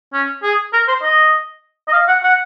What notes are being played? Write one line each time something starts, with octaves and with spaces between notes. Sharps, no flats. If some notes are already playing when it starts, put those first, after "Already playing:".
C#4
G#4
A#4
C5
D#5
D#5
F5
F#5
F#5